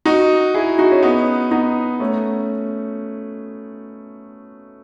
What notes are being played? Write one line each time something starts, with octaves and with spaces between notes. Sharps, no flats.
D#4 F#4
E4 G#4
D#4 F#4
C#4
B3 D#4
B3 D#4
A3 C#4